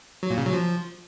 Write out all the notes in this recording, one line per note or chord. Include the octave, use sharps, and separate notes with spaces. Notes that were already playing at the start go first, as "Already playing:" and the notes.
F#3
A#2
C#3
F#3
F3